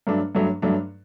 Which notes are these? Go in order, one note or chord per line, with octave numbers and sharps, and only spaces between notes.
G2 F#3 A3 D4
G2 F#3 A3 D4
G2 F#3 A3 D4